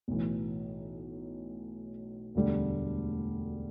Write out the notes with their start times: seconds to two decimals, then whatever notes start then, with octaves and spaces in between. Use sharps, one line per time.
0.08 B1 A2 E3
2.35 E1 D2 D3 G3